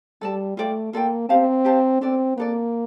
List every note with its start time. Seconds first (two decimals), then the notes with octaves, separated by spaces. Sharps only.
0.21 G3 A4 D5 A5
0.57 A3 F4 A4 D5 G5
0.93 A#3 F4 A4 D5 G5
1.29 C4 G4 C5 F5 A5
1.65 G4 C5 F5 A5
2.01 C4 D4 A4 D5
2.37 A#3 D4 A4 D5